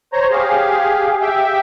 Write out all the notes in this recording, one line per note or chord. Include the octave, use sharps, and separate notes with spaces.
C5 C#5 A#5
G4 G#4 F5
G4 E5 G5